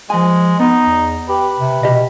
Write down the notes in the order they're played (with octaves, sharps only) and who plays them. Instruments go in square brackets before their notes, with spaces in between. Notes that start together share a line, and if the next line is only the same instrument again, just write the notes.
[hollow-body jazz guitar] F3 G#5 [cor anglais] G#3
[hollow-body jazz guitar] B3 [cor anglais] D#4
[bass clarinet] E2
[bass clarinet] G4 [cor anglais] B4
[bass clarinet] C3
[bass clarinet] B2 [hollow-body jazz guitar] G4 D#5